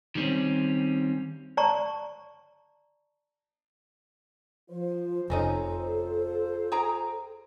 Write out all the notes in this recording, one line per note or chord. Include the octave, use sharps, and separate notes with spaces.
D#3 G3 C4 C#4
D5 A5 A#5 C#6
F3 F4 C5
F1 C4 C#4 D#4 A4
G#4 G5 A#5